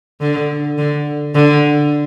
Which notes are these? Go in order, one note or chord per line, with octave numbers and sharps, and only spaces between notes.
D3
D3
D3